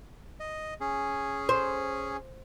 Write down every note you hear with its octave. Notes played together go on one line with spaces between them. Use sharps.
D#5
C#4 G#4
C5